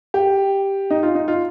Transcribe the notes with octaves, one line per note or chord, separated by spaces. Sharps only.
G4
D#4
F4
D#4
F4